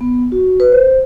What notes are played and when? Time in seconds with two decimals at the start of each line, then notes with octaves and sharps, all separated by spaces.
0.01 B3
0.32 F#4
0.60 B4
0.72 C5